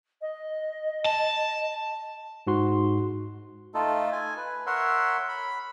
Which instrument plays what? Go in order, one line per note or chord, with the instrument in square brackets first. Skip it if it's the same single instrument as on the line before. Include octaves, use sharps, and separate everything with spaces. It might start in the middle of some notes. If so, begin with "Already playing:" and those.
[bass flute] D#5
[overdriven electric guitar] A5
[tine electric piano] G#2 F#4 C6
[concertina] A3 D#4 F4 A4
G#5
B4
A#4 C#5 E5 F#5 C6
B5